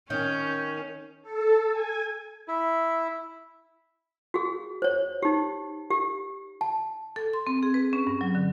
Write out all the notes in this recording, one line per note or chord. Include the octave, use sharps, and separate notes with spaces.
D#3 C#4 C#5 G6
A4
G#5
E4
F#4 G#4
C5 C#5
D#4 G4
G4
A5
A4
C6
C4
G#4
B4
C#4
G2
F#3
D3